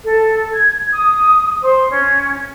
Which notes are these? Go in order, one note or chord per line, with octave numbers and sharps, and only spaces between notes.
A4
G#6
D#6
C5
C#4